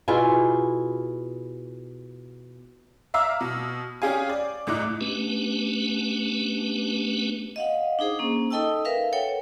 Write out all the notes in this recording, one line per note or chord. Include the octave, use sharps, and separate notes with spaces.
B2 E4 F4 G#4
E5 F5 A#5 D6 E6 F6
B2
C#4 G4 G#4 F5 G#5
D5
C#2 A2 D#4 D6 F#6
A3 B3 C#4 D4 G4 B4
D#5 F5 F#5
D4 D#4 G#4 C5
A#3 C#4
D#4 A4 D#5 G5 A5 E6
A#4 B4 E5 F5
A4 C#5 F#5 G5